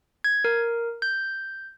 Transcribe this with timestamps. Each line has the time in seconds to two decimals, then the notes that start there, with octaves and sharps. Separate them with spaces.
0.24 G#6
0.44 A#4
1.02 G6